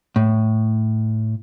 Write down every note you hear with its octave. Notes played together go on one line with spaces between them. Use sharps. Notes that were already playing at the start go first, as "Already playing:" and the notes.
A2